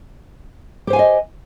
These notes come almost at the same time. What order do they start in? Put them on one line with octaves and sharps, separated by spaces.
G4 C5 G#5 F5 D#5